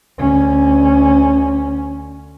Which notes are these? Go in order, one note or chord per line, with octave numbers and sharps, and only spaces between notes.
D2 C#4